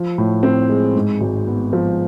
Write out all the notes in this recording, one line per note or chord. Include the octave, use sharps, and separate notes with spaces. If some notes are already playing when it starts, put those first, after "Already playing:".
Already playing: F3
A2
C4
G#3
G#2
G#1
B3
F3